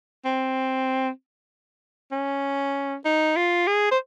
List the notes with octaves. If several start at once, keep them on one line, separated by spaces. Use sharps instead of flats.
C4
C#4
D#4
F4
G#4
C5